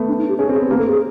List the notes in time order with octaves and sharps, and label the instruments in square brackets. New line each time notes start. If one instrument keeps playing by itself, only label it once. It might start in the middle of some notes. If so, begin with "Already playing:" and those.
Already playing: [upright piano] A3 B3
[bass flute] D4
D#4
G4
[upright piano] C#4 [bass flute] G#4
[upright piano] C4 [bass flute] G#4
[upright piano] B3
[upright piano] A#3 C4 [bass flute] G4
[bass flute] A4
G#4